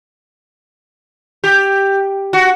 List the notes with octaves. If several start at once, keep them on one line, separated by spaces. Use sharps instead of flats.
G4
F#4